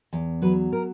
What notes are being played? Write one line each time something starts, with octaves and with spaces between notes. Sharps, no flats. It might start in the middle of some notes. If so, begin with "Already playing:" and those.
E2
F#3 B4
A#4